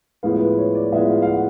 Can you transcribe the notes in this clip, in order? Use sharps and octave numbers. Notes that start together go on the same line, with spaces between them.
A2 F3 G#3 B3 F5
B4
C#5
D5
A2 F3 G#3 B3 E5
F5
F5
F#5